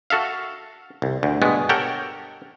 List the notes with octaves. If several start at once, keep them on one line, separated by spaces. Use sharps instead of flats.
F#4 A4 E5 F5
C2
D2
G2 B2 G#3 B3
G4 A4 A#4 C#5 F#5 G5